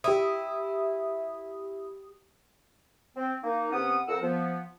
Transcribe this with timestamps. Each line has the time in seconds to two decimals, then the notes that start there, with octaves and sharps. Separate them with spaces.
0.04 E4 G4 D#6
3.15 C4
3.43 A#3 D#4
3.72 C3 B3 C#4 F#5 D#6
4.08 F2 A#4 F#5 E6
4.22 F3 B3